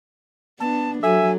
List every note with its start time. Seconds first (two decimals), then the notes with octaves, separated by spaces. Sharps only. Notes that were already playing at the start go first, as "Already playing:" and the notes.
0.60 B3 D4 A5
1.03 F#3 A4 E5 G#5